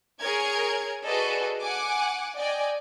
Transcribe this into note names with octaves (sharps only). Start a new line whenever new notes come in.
G#4 A#4 C#5 G#6
F#4 G#4 A4 B4 D5 D#5
F#5 G#5 D6
D5 D#5 G5 G#5